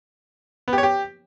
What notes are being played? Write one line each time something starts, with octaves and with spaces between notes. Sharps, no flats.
B3
G4
C#5
G4